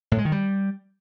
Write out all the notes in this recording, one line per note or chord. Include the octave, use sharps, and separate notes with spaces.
A2
G#3
D#3
G3